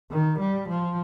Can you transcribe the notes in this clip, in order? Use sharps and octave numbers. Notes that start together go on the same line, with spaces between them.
D#3
G3
F3